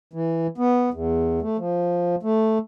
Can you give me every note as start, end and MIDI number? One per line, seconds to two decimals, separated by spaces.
0.13 0.47 52
0.58 0.90 59
0.94 1.40 40
1.42 1.57 57
1.58 2.15 53
2.23 2.58 57